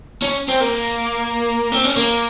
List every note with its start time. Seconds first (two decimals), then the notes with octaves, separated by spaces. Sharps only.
0.23 C#4
0.48 C4
0.61 A#3
1.72 C4
1.84 C#4
1.97 A#3